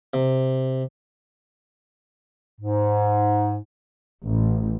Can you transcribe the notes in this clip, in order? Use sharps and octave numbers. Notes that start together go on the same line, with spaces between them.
C3
G#2
A1